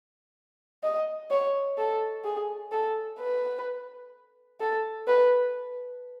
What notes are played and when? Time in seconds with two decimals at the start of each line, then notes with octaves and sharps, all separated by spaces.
0.83 D#5
1.30 C#5
1.78 A4
2.24 G#4
2.72 A4
3.19 B4
4.60 A4
5.07 B4